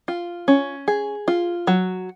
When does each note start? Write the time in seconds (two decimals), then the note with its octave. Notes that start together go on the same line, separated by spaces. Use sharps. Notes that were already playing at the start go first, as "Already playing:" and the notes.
0.08 F4
0.48 C#4
0.88 G#4
1.28 F4
1.67 F#3